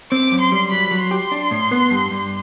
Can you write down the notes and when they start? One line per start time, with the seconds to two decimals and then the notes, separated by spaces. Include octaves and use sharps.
0.11 C4 D6
0.32 F#2
0.41 C6
0.52 G3
0.72 F#3 B5
0.91 F#3
1.01 C6
1.11 G4
1.32 D4
1.51 A2
1.71 B3
1.91 G2
2.11 G2